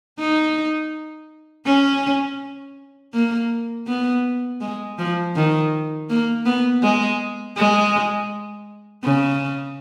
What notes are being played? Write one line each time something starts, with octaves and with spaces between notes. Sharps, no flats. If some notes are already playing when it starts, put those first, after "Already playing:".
D#4
C#4
A#3
B3
G#3
F3
D#3
A#3
B3
G#3
G#3
C#3